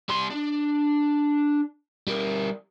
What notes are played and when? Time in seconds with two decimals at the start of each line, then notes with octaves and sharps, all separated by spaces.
0.09 G3 C6
0.31 D4
2.07 G3 A#4